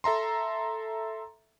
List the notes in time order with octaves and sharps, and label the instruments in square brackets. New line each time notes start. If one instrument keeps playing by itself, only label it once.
[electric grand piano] A4 E5 A#5 C6